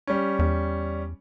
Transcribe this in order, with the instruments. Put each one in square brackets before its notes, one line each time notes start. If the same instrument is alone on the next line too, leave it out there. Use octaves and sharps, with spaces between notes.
[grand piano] G3 C#4
[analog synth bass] E2